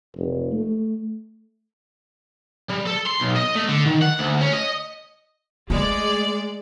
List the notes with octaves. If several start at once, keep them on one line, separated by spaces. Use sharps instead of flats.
F1
A3
G3
A4
C6
B1
D#5
A3
D3
D#3
F#5
D2
C#4
D#5
G#3 A3 D5